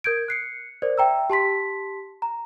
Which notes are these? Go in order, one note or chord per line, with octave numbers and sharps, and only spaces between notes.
A#4 G6 G#6 D7
F#6 C7 C#7
A#4 C5 D5
E5 G5 A#5 E6
G4 A5 C6 B6
A#5